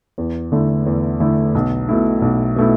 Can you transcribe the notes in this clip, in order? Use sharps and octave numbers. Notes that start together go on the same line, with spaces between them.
E2
D3 A3 E4
E2
D3 A3 E4
B1
B2 A3 E4
B1
B2 A3 E4